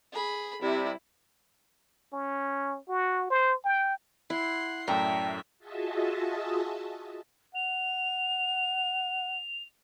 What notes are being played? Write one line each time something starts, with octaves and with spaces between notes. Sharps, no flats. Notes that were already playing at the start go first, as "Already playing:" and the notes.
G#4 B5
C3 G3 E4
C#4
F#4
C5
G5
E4 F#5 C6
F#2 A2 D5 E5 G5 A5 A#5
F4 F#4 G#4 D#5 E5 A5
F#5 F7